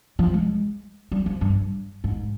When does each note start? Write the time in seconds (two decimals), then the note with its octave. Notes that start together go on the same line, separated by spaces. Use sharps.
0.19 F3
0.34 G#3
1.11 G3
1.26 F3
1.41 G2
2.04 G#2